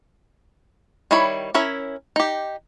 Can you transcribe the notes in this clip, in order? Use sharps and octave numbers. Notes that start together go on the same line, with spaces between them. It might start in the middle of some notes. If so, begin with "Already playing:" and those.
D#3 G3 E4 C#5 B5
C#4 E4 A#4 E5
D#4 G4